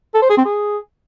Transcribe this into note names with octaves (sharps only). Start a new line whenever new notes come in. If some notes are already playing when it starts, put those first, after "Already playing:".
A4
C5
G#4
C4
G#4